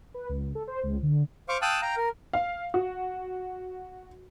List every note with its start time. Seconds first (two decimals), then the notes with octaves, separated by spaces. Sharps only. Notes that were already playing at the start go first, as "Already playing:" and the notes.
0.14 B4
0.29 C#2
0.55 A4
0.68 C5
0.83 C#2
1.03 D3
1.49 C5 F5 C#6 D6
1.62 F5 G5 A5 D#6 E6 F#6
1.82 F5 G5 A#5
1.97 A#4
2.33 F5
2.74 F#4